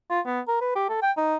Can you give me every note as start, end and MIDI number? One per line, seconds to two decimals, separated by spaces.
0.10 0.20 65
0.26 0.41 59
0.48 0.58 70
0.61 0.74 71
0.75 0.85 67
0.89 0.98 69
1.02 1.12 79
1.17 1.37 63